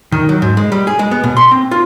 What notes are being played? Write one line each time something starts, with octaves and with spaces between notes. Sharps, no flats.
D#3
F#3
G#2
G#3
G3
G#4
G#3
B3
B2
C6
C4
F4